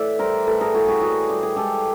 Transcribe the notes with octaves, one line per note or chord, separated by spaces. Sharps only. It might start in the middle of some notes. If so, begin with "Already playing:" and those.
Already playing: A2 E3 D5 E5
G3 A#4 C5
A2 A4 B4
G#4 A#4
A2 F#4 G#4
F#4 G#4
E3 F#4 G#4
G3 G4
G#4
G#3 G4 A4